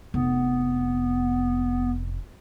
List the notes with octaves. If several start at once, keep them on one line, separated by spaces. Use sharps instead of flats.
F1 B3